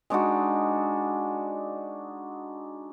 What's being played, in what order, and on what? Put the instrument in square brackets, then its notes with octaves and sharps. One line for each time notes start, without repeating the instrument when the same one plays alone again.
[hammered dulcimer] G#3 D4 D#4 F#4